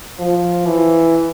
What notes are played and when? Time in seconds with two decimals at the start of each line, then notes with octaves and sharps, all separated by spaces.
0.19 F3
0.66 E3